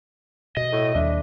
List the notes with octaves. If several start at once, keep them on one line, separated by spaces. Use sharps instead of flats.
B2 D#5
A2
D#2 G3 D4 E5